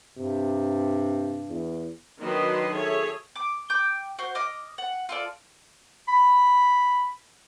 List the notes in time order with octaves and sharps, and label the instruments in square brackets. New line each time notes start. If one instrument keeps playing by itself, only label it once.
[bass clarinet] G2 [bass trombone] C3
[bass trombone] E2
[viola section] D#3 F#3 D4 B4 D#5 C6
G#4 A4 C#5 E5
[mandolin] D6
G5 D6 G6
F#4 C5
D#5 D6 F6
F#5
F4 A4 D5
[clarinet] B5